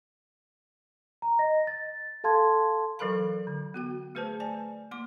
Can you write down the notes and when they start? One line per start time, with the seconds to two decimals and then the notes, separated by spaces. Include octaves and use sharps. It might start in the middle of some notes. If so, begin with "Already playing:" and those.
1.22 A#5
1.39 D#5 A#6
1.67 A6
2.24 A4 F5 A5 C6 G#6
2.99 E3 F#3 A4 A#4 F5 B5
3.47 D3
3.74 B3 F#4 G5
4.15 A3 G#4 B4 C5 A5
4.40 D5 G#5 A5
4.91 A#3 C6 D6